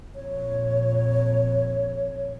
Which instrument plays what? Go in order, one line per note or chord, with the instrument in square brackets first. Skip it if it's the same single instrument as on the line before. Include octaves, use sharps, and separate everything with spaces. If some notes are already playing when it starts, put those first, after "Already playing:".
[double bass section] A#1 F2 [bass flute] C#5